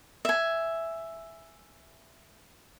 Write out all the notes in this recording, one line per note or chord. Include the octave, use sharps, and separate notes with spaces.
E5 G#5